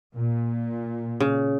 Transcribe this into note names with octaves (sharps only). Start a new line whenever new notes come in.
A#2
C#3